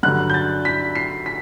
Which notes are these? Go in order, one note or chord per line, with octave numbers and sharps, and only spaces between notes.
G2 D3 F#3 F#6
G6
A6
B6
C7
B6